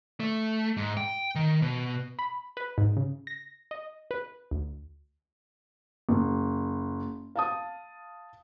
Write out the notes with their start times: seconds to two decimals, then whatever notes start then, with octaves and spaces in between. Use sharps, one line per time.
0.20 A3
0.77 G#2
0.97 G5
1.35 D#3
1.62 B2
2.19 B5
2.57 B4
2.78 G#2
2.97 C#3
3.27 A#6
3.71 D#5
4.11 B4
4.51 D2
6.09 F#1
7.36 F5 A5 D#6